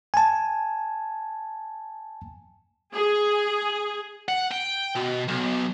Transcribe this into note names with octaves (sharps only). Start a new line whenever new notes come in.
G#5 A5
G#4
F#5
G5
B2
B1